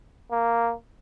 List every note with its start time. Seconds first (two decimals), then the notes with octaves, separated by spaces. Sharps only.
0.31 A#3